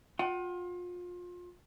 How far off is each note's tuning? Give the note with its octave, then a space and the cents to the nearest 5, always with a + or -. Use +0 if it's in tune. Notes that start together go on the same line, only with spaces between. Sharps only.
F4 +30 F#5 +40